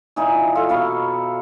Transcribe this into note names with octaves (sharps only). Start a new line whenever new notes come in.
A#2 E3 D#4
F4 A4
B2 C#5 F5 B5